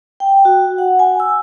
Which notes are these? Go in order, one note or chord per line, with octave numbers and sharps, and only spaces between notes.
G5
F#4
F#5
G#5
E6